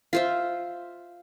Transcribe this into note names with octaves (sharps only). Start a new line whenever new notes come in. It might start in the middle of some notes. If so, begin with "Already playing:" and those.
F4 C5 E5